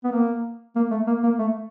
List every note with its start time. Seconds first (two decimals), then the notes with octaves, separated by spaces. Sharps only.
0.04 B3
0.12 A#3
0.76 A#3
0.91 A3
1.07 A#3
1.23 A#3
1.39 A3